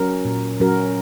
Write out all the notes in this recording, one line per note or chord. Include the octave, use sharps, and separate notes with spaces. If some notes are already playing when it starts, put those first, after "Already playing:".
Already playing: F#3 C#4 F#4 A#4
A#2
F#3 C#4 F#4 A#4